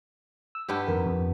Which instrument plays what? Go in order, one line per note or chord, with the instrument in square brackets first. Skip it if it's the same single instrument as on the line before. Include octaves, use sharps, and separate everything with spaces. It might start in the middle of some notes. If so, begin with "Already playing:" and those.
[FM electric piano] E6
[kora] G2 B3 G4
[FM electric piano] F2 D#3 A#4
F2